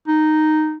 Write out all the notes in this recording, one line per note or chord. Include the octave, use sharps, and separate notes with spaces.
D#4